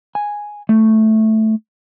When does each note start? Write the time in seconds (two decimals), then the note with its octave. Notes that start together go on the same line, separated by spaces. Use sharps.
0.15 G#5
0.69 A3